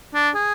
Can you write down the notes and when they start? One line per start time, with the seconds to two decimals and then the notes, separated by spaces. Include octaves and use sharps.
0.14 D4
0.35 G#4